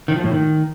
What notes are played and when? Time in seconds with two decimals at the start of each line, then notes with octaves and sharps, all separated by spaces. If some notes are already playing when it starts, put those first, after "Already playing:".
0.08 D#3
0.16 F3
0.24 A2
0.32 D#3